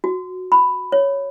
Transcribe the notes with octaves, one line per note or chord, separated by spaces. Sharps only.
F#4
B5
C#5